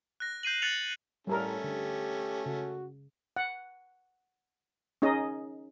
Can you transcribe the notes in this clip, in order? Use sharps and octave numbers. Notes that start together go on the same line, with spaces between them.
F#6 A#6
G6 C7 D#7 F#7
F#6 A6 C#7 F7 F#7
A2 G3 A3 C#4 A4 A#4
D3 G4
C#3 F#4
F#5
C#4 D#4 G#4 D#5